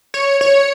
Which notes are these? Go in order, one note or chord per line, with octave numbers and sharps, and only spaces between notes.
C#5
C#5